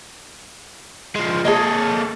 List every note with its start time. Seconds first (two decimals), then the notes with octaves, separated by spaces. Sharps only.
1.16 F3 G#3
1.45 A#3 G#4 A4 C#5 D#5